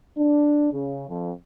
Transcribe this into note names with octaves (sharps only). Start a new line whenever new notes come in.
D4
C#3
F2